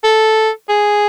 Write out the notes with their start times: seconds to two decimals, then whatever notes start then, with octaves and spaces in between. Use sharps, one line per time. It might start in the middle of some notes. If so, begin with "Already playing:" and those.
0.04 A4
0.69 G#4